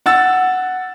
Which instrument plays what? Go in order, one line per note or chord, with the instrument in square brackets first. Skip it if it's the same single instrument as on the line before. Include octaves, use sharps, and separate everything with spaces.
[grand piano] F#5 E6 A6